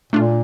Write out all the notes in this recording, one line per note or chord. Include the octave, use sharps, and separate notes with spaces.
A#2 A3 D4 F4